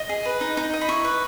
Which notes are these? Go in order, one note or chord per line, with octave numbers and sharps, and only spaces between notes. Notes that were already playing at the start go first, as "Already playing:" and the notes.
Already playing: D#5
G#4
B4
D#4
D#4
D#5
B5
E4 C#6
B4